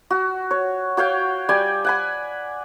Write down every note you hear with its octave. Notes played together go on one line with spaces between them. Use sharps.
F#4
C#5
F#4 C#5 F5 G5
G3 D5 G5 G#5
F#5 G#5 B5